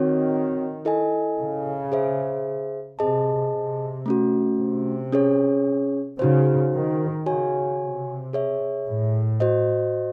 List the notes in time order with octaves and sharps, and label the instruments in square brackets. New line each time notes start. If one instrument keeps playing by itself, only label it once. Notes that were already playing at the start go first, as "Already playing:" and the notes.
Already playing: [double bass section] D#3 [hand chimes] C4 F#4 C#5
[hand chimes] E4 A4 D#5 G#5
[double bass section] C#3
[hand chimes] G#4 C5 E5
[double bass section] C3 [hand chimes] G#4 D#5 A5
[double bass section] C3
[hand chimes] A3 C#4 F#4
[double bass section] C3
[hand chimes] C#4 G#4 C#5
[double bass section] C#3 [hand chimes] D#4 F#4 C5
[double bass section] D#3
[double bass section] C#3 [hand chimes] F#4 C#5 G#5
[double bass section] C3
[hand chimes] G#4 C#5 E5
[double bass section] A2
[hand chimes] F#4 C5 D#5